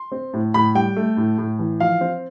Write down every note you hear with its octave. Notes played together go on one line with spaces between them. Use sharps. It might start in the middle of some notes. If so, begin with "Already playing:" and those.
Already playing: C6
C4
A2
A2 B5
G3 G5
A3
A2
A2
E3
F3 F5
C4